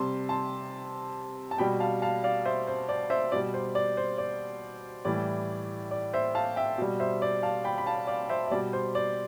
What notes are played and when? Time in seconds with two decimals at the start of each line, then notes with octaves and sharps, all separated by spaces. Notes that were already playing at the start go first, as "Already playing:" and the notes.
Already playing: C3 G3 A5 C6
0.29 A5 C6
1.51 A5
1.58 B2 G3 G5 B5
1.80 F5 A5
2.02 F5 A5
2.24 D5 F5
2.45 C5 E5
2.67 C5
2.89 D5
3.10 C5 E5
3.32 B2 G3 D5
3.54 C5
3.75 D5
3.97 C5
4.18 D5
5.05 A2 E3 G3 D5
5.91 D5
6.13 C5 E5
6.35 F5 A5
6.56 E5 G5
6.78 B2 G3
7.00 C5 E5
7.22 D5
7.43 F5 A5
7.64 G5 B5
7.78 B5
7.86 F5 A5
8.07 D5 F5
8.29 C5 E5
8.47 E5
8.51 B2 G3 D5
8.73 C5
8.95 D5